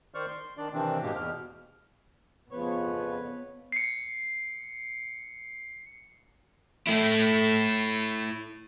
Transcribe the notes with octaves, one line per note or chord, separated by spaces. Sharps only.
D#3 C5 D5 C#6 F6
C6
D#3 D4 D5
C3 D#3 E3 C4 D4
G#2 B2 A#3 G4
E2 B2 F6
F2 C#3 F3 B3 B4 C#5
C7 C#7
A3 E4